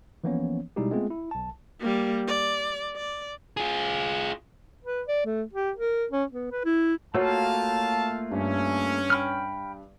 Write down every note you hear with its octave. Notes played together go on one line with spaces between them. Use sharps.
E3 F3 A#3 B3 C#4 C#5
B2 G3 G#3 D#4 E4 G4
G#3 A3 B3 C4 F4 G#4
E4
B1 A5
G3 A#3
D5
D5
F4 G#4
B4
D5
A3
G4
A#4
C#4
B3
B4
E4
A3 A#3 F4 F#4 C#5 F5 A5
G2 C#4
G5 B5 F6